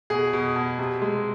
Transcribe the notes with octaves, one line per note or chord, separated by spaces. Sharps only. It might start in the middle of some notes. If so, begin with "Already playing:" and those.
B2 G#4
B2
B2
C3
G#3